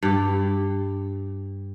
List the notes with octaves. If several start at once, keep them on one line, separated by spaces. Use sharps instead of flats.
G2 G4